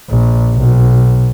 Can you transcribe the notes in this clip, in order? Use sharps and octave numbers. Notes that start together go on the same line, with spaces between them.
A#1
B1